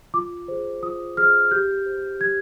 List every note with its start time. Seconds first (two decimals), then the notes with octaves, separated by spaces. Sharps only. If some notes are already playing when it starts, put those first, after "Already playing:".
0.14 F4 D6
0.48 G#4 C5
0.83 F4 D#6
1.17 G#4 C5 F6
1.51 G4 G6
1.86 C5
2.20 G4 G#6